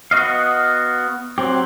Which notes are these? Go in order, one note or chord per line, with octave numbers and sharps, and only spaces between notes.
B3 F#4 D#5 F5
F#3 C4 G4